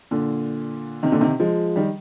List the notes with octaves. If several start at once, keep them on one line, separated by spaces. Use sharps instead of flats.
A#2 D3
C3 D#3
A#2 D3
C3 D#3
F3 G#3
D#3 G3